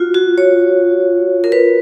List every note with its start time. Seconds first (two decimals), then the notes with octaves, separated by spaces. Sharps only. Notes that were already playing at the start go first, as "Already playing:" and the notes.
Already playing: F4 F#4
0.14 F#4
0.38 C#5
1.44 A#4
1.52 B4